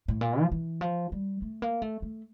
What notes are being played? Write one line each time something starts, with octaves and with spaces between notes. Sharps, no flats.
A2
A#2
F3
E3
F3
G3
A3
A#3
A3
A3